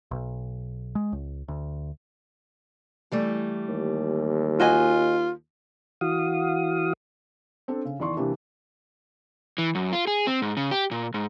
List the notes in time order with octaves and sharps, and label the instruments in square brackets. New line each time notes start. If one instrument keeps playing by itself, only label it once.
[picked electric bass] B1
G#3
C#2
D2
[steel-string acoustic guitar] E3 G3 A3
[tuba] D#2
[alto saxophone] F4 [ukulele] F#4 D#5 G#5
[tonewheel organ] E3 F#4 F5 D#6
[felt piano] C4 D4 A4
C#3
E2 D#3 D5 C6 C#6
C3 E3 A#3 D4 G4
[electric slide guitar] E3
F#2
F4
G#4
C4
G#2
C#3
G4
A#2
G#2